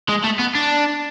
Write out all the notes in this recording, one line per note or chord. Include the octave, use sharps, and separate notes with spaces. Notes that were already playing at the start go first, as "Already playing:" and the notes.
G#3
A3
B3
D4